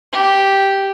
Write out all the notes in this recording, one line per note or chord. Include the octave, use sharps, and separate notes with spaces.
G4